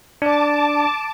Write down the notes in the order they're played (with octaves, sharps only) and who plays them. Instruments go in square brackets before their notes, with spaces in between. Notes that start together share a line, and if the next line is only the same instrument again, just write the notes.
[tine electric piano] D4 D5 [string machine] A5 D6